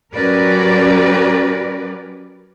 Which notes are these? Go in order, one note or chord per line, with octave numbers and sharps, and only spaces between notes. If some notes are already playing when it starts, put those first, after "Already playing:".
F#3 C#4 G4 A#4 B4 D5